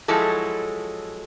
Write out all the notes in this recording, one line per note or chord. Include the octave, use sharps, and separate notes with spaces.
F3 F#3 G#3 E4 A4